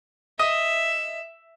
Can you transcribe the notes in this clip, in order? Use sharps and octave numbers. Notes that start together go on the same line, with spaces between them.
D#5 E5